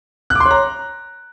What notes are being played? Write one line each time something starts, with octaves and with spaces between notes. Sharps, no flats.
F#6
D6
C6
C#5
A#5